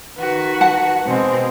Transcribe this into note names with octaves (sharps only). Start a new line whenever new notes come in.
D#3 F#4 B4
F#5 A5
B2 G#3 C4